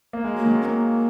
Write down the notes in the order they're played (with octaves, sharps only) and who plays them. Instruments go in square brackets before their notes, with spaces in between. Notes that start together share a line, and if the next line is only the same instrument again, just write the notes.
[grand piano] A#3
G#3
[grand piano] F#3 [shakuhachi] A#3
[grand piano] D#3 G#3
[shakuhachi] C#4
A#3